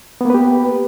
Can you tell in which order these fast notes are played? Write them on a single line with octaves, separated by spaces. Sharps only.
B3 A#3 B4 G4